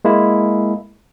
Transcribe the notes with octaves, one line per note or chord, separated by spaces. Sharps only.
G#3 A#3 E4